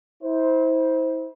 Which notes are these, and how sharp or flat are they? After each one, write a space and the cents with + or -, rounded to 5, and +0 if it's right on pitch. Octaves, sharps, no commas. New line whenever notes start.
E4 -35 C5 +0